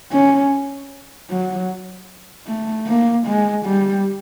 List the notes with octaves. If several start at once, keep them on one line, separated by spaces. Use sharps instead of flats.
C#4
F#3
A3
A#3
G#3
G3